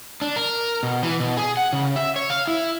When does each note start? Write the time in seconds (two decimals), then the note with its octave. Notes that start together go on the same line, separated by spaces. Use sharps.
0.22 D4
0.36 A#4
0.83 B2
1.03 E3
1.20 B2
1.37 G#4
1.57 F#5
1.73 C#3
1.96 E5
2.16 C#5
2.30 F5
2.47 E4